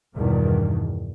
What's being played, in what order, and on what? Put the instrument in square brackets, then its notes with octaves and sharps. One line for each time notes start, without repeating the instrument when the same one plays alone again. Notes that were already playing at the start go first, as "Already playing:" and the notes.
[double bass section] E2 G2 B2 D#3